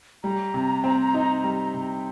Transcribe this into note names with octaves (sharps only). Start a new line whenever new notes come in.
G3 A#5
C3
C4
D#4
G3
C3